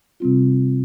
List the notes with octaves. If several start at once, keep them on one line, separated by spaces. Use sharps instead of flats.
C3 G3 C4 F4